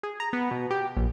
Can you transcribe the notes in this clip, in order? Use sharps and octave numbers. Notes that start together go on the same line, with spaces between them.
G#4
A#5
B3
B2
G4
A#1